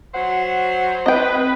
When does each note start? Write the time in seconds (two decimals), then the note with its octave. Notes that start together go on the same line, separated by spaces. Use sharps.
0.14 F#3 C5 F#5
1.06 C4 B4 D#5 G5